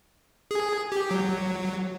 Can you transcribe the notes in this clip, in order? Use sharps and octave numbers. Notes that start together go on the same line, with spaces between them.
G#4
G4
F#3